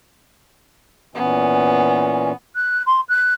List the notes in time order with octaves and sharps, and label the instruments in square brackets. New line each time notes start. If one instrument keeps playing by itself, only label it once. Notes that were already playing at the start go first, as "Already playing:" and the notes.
[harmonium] A#2 E3 C#4 [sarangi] B3
[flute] F#6
C6
F#6